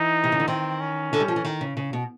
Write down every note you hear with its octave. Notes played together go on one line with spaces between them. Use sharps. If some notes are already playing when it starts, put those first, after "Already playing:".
Already playing: E3 D#4
C3
C#3
D3
D#3 C4
C#4
D3
G3
F3
E3
D#3
C#3
C#3
B2